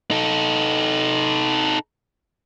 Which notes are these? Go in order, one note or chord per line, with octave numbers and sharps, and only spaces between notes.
D#4 A4